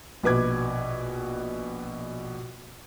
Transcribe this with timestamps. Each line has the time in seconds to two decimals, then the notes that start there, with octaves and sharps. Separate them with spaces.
0.23 A#1 B2 B4 D6 G#6